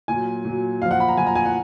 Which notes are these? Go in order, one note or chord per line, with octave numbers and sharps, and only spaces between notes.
A#2 F#3 G#5
A#2 F#3
A#2 F3 F5
F#5
B5
A#5
A#2 F3 G#5
A#5
G#5
F#5